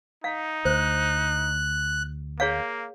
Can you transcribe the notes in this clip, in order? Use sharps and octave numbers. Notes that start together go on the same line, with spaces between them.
D#4 F5
D2 C5 F#6
A#3 G#4 C#5 F5